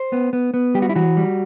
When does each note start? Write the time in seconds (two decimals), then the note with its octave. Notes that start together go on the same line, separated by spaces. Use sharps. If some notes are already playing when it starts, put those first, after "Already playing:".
Already playing: C5
0.12 B3
0.33 B3
0.54 B3
0.74 G3 G4
0.82 F#4
0.89 E4
0.96 E3 F#4
1.17 G3